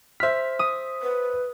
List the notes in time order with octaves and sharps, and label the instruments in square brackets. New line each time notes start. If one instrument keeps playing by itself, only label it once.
[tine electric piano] C5 B6 [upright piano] E5 F6
[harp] D#6
[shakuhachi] B4